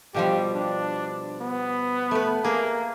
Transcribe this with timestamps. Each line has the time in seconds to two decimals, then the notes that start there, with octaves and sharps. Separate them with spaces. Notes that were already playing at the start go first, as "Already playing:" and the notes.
0.14 B2 F3 G3 G4
0.55 D4
1.41 B3
2.11 A3 B4
2.44 A#3 G#4